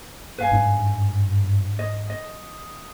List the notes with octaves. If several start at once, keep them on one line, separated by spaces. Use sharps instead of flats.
G2 B4 F5 G#5
G#2 C4 D4
D#5 D#6
D#5